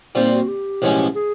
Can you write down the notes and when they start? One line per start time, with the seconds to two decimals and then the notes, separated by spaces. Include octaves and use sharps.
0.15 A#2 G3 C4 D#4 F4
0.32 F#4
0.48 G4
0.82 B1 A2 F3 G#3 C#4
1.15 G#4